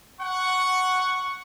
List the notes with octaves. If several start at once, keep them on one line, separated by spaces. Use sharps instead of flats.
F#5 C#6